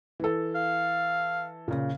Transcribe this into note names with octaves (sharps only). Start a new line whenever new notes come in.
E3 A4
F5
A#2 C#3